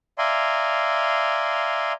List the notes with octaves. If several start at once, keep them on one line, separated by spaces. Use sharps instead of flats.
D5 E5 F5 G#5 A#5 C6